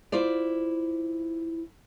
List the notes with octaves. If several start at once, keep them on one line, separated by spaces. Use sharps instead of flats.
E4 F4 C5 D5